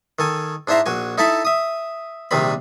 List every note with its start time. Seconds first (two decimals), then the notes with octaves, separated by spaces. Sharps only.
0.19 D#3 A4 G#5
0.67 G#2 D4 E4 C5 E5 A#5
0.86 A#1 F#4 G#5
1.18 D#4 E4 A4 E5 A5 B5
1.45 E5 D#6
2.31 A#1 C3 D#3 G3 C4 B5